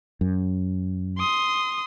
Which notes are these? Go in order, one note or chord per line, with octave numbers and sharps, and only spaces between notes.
F#2
C6 D#6